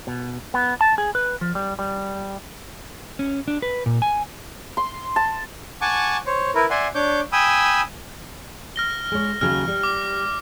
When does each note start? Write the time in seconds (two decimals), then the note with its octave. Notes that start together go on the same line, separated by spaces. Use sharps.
0.07 B2
0.54 B3
0.81 A5
0.98 G#4
1.15 B4
1.41 F3
1.55 G3
1.79 G3
3.19 C#4
3.48 D4
3.62 B4
3.86 A#2
4.02 G#5
4.77 C6
5.16 A5
5.81 F#5 G#5 A5 C#6 D6
6.26 C5 C#5
6.55 E4 A#4 B4
6.70 D5 E5 F#5 G#5 C6
6.95 D4 C#5 D6 G6
7.32 G5 G#5 B5 D#6 E6
8.76 F6 A#6 G7
9.12 G#3 C#5
9.41 D#2 C#3 F#3 F6
9.68 G3
9.83 D6